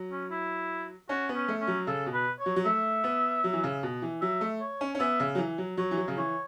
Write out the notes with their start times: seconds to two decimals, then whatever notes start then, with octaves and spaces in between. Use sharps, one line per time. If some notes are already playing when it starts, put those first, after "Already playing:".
Already playing: F#3
0.11 C#4
0.31 E4
1.09 C#4 F#4
1.29 B3
1.35 C#4
1.48 A3
1.61 C#4
1.67 F#3
1.87 C#3 A4
2.06 B2
2.13 B4
2.39 C#5
2.46 F#3
2.56 F#3
2.65 A3 E5
3.04 B3
3.44 F#3
3.53 E3
3.63 C#3
3.83 B2
4.02 E3
4.21 F#3 E5
4.41 A3
4.61 C#5
4.81 C#4
4.95 C#4
5.00 B3 E5
5.20 C#3
5.35 F#3
5.38 E3
5.58 F#3
5.77 F#3 C#5
5.91 E3
5.97 F#3
6.08 C#3
6.17 E3 C#5